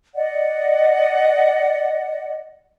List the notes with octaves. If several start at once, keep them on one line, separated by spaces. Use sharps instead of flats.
D5 D#5 F#5